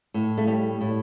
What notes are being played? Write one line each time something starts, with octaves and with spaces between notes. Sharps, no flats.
A2
A3
A2 G3
A2